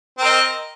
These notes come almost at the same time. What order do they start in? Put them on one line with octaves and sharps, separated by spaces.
C4 A#4 D#5